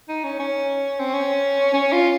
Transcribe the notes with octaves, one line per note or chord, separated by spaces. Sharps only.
D#4
C#4
C#4
C4
C#4
C#4
F4